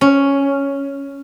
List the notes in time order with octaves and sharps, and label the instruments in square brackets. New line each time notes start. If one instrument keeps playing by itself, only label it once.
[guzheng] C#4